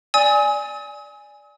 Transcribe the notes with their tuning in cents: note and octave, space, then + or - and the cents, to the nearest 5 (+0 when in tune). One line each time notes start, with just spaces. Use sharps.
D5 +0 G#5 +0 D#6 +45